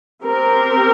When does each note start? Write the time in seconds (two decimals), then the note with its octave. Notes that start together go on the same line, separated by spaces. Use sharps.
0.23 C4 G4 A#4